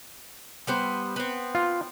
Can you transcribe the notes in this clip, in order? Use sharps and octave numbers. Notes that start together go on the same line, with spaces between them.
G3 B3 C5
B3 C4
F4